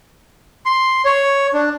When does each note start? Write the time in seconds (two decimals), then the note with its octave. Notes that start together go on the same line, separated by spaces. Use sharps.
0.66 C6
1.05 C#5
1.54 D4